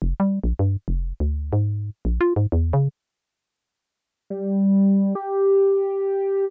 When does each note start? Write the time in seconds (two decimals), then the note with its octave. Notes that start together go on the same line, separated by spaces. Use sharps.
0.02 F1
0.20 G3
0.44 A#1
0.59 G2
0.88 F1
1.20 D2
1.53 G#2
2.05 A#1
2.21 F4
2.36 G#2
2.52 E2
2.73 C#3
4.30 G3
5.15 G4